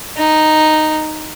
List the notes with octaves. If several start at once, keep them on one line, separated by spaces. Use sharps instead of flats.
D#4